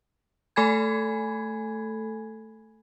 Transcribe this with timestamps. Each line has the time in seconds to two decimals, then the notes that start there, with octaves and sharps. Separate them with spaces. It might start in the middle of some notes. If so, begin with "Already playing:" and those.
0.56 A3 A4 G#5 B5 G#6